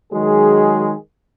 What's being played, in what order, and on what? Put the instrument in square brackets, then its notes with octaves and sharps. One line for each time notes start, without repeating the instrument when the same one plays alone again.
[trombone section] D#3 F#3 G#3 G#4